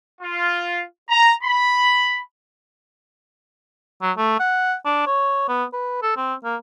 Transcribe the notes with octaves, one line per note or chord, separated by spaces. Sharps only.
F4
A#5
B5
F#3
A3
F#5
D4
C#5
B3
B4
A4
C4
A#3